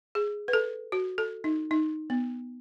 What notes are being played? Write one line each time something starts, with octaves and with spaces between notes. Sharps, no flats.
G#4
B4
A4
F#4
A4
D#4
D#4
B3